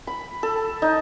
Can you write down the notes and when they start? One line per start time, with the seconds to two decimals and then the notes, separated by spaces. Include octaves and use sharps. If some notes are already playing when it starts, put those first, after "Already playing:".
0.07 B5
0.43 A4
0.82 D#4